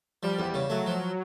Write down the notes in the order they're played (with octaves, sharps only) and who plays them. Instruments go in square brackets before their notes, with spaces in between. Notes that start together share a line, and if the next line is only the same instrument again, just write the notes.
[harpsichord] F3 [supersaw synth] G3
[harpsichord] E2
C#3
[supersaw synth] F#3 [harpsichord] A3
[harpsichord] F3